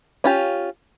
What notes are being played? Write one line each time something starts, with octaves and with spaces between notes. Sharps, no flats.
C#4 F4 G4